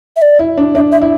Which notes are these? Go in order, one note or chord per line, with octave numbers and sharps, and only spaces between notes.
E5
D5
E4
D4
D4 E5
E5
E4